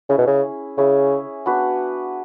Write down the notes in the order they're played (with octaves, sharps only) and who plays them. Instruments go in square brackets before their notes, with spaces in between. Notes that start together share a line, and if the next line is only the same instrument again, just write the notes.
[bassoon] C#3 [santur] C#4 E4 G#4
[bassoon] B2
C#3
[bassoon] C#3 [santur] C#4 E4 G#4
[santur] B3 D4 F#4 B4